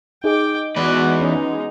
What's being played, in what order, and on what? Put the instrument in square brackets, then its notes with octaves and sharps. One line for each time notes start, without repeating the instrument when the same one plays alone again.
[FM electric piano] D#4 G#4 D#5 [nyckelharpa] G5 D6
[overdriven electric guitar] E2 B4 [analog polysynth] G#3 B3 [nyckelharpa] F#4 D5
[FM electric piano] C#4 [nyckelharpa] D#4